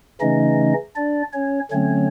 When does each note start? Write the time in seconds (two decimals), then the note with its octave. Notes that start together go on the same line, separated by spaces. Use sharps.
0.21 C#3 E3 A3 C#4 D#4 D#5
0.96 D4 D5
1.33 C#4 C#5
1.71 D3 F#3 A3 C4 C#4 C#5